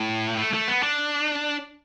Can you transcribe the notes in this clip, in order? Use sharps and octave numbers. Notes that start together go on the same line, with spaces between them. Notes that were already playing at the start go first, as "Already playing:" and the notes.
Already playing: A2
A3
A3
B3
D4